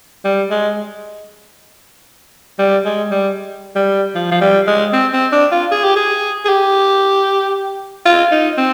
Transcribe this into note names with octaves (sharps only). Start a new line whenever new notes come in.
G3
G#3
G3
G#3
G3
G3
F3
F3
G3
G#3
C4
C4
D4
F4
G#4
G4
G#4
G#4
G4
F4
D#4
C4